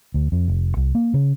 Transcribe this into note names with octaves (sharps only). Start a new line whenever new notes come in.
D2
F2
F1
C2
A#3
C#3